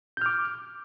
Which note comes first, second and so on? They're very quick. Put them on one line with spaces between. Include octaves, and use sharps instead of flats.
G6 F6 D6